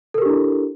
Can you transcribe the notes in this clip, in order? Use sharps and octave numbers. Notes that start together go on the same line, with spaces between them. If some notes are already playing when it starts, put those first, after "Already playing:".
D4 E4 G4 A4 A#4